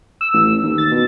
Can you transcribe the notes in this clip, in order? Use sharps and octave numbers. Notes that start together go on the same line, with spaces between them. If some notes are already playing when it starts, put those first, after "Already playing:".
E6
A1
D#2
A6
B2